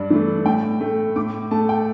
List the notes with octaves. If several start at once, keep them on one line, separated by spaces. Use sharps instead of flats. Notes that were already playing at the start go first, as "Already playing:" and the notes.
Already playing: G2 D5
E3 A3
A2 G5
A3
A2 D6
A3 A5
G5